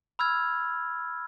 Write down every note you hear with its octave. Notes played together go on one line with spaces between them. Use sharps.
B5 E6 F6 G#6